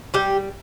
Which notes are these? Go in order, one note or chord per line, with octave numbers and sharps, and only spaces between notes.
G3 G4